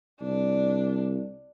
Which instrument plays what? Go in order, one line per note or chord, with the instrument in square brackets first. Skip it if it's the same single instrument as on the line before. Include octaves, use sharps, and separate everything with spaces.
[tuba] C2 [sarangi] D4